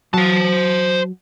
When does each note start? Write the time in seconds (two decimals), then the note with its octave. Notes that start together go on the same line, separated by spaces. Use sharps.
0.14 F#3 C5 A5